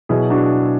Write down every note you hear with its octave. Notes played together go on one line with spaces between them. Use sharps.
B2 F#3 E4 G#4
D4 F#4